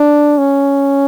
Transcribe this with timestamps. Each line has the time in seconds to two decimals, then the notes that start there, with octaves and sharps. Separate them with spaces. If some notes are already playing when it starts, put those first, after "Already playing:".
Already playing: D4
0.38 C#4